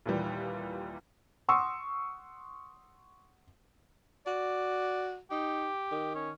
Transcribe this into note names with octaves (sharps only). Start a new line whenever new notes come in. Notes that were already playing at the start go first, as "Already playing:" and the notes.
D#2 A#2 E3 G3
F#5 C6 C#6 D#6 E6
F#4 D5
D#4 G4
D#3
C#4